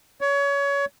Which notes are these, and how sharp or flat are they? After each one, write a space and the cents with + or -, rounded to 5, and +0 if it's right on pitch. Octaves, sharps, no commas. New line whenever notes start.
C#5 +25